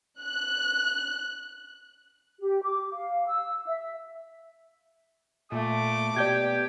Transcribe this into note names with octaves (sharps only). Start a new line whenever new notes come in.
F#6
G4
D6
F5
E6
E5
A#2 A3 D6
B2 G4 D5 G6 G#6